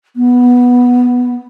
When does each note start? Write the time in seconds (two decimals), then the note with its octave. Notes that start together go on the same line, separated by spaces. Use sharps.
0.16 B3